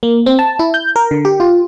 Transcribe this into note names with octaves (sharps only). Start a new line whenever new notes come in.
A#3
C4
A5
E4
G6
A#4
D3
G4
F4